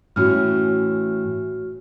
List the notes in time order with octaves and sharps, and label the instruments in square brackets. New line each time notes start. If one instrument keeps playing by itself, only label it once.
[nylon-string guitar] A2 E3 C#4 [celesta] F#4 F6